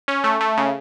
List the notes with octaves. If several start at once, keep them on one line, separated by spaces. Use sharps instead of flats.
C#4
A3
A3
C#3